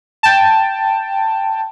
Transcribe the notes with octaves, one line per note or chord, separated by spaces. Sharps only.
G5 A5